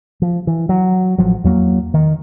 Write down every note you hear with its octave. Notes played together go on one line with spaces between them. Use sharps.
F3
E3
F#3
A1 F3 F#3
E2 F#3 A#3
D#3